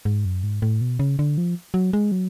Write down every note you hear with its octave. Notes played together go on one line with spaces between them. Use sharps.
G#2
F#2
G#2
A2
B2
C#3
D3
F3
F#3
G#3
F#3